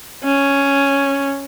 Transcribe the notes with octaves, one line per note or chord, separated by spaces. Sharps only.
C#4